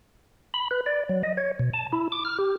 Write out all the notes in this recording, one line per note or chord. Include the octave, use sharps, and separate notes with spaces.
B5
B4
D5
F#3
D#5
C#5
B2
A5
E4
D6
F6
G4